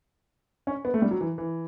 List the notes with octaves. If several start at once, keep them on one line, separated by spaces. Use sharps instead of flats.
C#4
B3
A3
G3
F#3
E3
E3